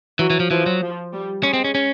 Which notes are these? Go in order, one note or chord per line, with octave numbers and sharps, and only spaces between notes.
E3 F#3
E3
F3
E3 F3
F#3
F3
G3
G#3 C#4
C4
C#4
C#4